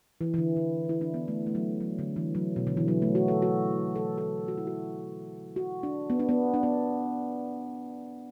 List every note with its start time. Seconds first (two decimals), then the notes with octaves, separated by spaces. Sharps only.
0.21 E3
0.34 E3
0.38 D3
0.56 D3
0.89 E4
1.01 D4
1.14 B3
1.28 A3
1.46 A3
1.55 F#3
1.80 F#3
1.99 D3
2.16 E3
2.35 F#3
2.56 B2
2.67 D3
2.77 E3
2.88 F#3
3.02 A3
3.15 F#4
3.28 A4
3.42 F#4
3.96 A4
4.18 A4
4.48 F#4
4.57 E4
4.67 F#4
5.56 F#4
5.83 D4
6.10 B3
6.19 D4
6.29 B3
6.54 D4
6.63 B3